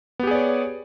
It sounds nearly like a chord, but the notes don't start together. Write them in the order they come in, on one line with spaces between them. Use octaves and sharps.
B3 G4 G#4 D5 C#5